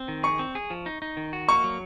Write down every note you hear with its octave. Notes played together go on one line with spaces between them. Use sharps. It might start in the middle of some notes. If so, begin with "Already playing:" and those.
Already playing: C4
D#3
G#4 C#6
C4
G#4
F3
D#4
D#4
D#3
F#4
A#3 C#6
F#3